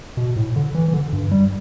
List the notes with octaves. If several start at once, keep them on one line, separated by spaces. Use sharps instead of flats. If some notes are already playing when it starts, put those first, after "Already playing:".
B2
A2
D3
E3
E3
D3
G2
G3